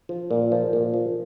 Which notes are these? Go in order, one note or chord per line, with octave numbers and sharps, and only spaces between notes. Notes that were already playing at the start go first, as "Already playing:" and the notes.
F3
A#2
F3
A#2
F3